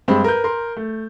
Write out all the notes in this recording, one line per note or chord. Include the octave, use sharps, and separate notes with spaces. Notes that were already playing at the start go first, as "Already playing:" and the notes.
G2 G#3 C4 B5
A#4 B4 G6
A#4 C6
A3